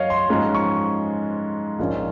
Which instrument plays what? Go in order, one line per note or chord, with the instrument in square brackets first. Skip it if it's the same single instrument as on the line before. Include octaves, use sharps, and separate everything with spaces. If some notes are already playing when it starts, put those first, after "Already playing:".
Already playing: [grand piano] F#2 F#3 C#5 D#5 F5
C6
G#2 F3 G#3 C#4
C#6
A#1 G#2 F3 A#3 C#4